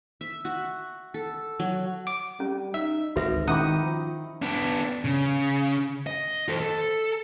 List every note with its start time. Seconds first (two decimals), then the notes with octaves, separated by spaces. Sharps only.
0.21 E5
0.45 F#4
1.14 A4
1.59 F#3
2.07 D6
2.40 G3 C#4
2.74 D#4 E5
3.16 G#1 D2 F#4 B4 E5
3.48 D#3 C#4 D#4 E4 F#5 D6 D#6
3.80 F3
4.42 B3 D4
5.05 C#3
6.07 D#5
6.49 A4 C5
6.61 A4